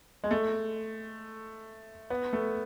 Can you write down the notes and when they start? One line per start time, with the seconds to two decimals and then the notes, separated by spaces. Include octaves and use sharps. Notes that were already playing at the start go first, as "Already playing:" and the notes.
0.24 G#3
0.31 A3
2.10 B3
2.33 A3